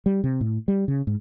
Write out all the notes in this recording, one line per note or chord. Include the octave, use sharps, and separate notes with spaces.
G3
C3
A2
G3
C#3
G#2